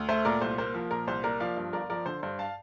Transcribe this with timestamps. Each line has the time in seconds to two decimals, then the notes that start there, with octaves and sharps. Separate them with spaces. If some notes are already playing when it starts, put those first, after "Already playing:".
Already playing: D2
0.09 A3 C5 E5
0.25 A#2 A#4 D5
0.41 C2 C5
0.58 A#3 C5
0.74 F3
0.91 A#2 A#4
1.07 C2 C5
1.24 A#3 A#4 D5
1.40 F3 D5 F5
1.57 G2
1.73 G1 A#4 D5
1.90 F3 A#4 D5
2.06 D3 C5
2.23 G2 C5
2.39 F5 A5